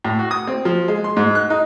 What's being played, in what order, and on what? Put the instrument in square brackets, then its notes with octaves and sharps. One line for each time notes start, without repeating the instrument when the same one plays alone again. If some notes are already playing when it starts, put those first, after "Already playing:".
[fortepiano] A2
F#4
D#6
C4
F3
G#3
C6
G#2
F#6
D#4